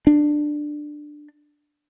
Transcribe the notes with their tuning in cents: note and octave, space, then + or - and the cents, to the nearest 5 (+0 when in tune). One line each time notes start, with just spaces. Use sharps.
D4 +15